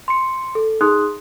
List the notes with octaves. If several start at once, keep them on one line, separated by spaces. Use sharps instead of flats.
C6 C#7
A4
D#4 G#4 C6 D#6 F#6